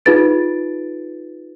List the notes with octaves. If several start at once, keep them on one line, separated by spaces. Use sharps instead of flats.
D#4 F4 G#4 B4 A6 D7